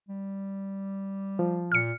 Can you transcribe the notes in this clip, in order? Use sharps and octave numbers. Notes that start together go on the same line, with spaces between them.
G3
F3
A#2 F6 C#7